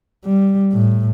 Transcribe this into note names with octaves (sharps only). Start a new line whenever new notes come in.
G3
A2